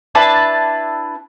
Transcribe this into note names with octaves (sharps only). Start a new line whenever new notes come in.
D4 E4 B4 A5